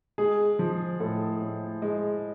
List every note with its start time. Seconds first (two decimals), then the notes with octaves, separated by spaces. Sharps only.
0.18 G#3 G#4
0.59 F3
1.00 A2 A4
1.41 A2
1.82 G#3